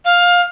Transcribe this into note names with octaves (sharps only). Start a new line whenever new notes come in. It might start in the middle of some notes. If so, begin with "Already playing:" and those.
F5